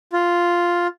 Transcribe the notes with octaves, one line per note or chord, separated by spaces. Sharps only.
F4